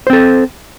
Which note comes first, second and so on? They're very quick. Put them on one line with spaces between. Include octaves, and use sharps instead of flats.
C5 C4 A4